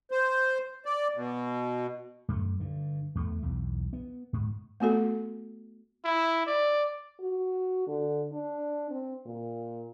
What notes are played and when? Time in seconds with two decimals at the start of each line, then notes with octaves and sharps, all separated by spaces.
0.11 C5
0.86 D5
1.15 B2
2.28 F#2 A3
2.60 G2 D3
3.15 E2 A3
3.42 B1 E2
3.93 B3
4.33 G#2
4.80 A3 B3 F#4 A4
6.05 E4
6.47 D5
7.20 F#4
7.87 D3
8.32 D4
8.90 C4
9.26 A#2